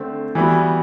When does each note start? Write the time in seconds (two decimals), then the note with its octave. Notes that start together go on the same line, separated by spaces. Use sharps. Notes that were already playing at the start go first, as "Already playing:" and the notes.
Already playing: D3 A3 C4
0.35 E3 G3 B3 F#4